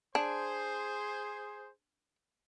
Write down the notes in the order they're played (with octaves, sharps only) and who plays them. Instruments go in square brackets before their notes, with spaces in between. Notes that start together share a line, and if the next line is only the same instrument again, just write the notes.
[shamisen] D4 [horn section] G#4 C5